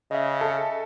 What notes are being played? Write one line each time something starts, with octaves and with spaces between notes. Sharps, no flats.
C#3 D#5 E5
A4